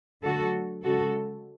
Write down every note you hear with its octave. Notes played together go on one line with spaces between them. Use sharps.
D3 F#3 A3 F#4 A4
C#3 G#3 F#4 A4